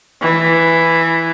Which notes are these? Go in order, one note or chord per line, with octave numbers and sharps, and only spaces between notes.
E3